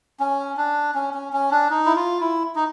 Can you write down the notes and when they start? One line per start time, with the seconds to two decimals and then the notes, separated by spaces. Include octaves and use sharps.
0.20 C#4
0.57 D4
0.95 C#4
1.14 C#4
1.33 C#4
1.51 D4
1.70 D#4
1.86 E4
1.95 F4
2.20 E4
2.56 D#4